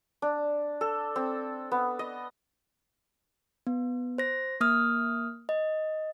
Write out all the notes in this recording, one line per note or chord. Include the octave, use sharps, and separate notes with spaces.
D4
A4
C4
B3
D#5
B3
C5 A#6
A#3 D#6 F6
D#5